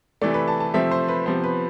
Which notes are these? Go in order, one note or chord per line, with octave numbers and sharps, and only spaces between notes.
C3 E3 A3 D5
B4
A5
A5
C3 F3 A3 C4 E5
C5
B4
C3 F3 B3 C5
B4